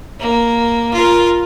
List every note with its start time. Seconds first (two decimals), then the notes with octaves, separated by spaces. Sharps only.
0.20 A#3
0.94 F4 A#4